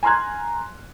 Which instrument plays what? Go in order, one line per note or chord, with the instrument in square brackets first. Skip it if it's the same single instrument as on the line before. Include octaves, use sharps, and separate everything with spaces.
[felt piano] G#5 A#5 C6 F6 F#6 G#6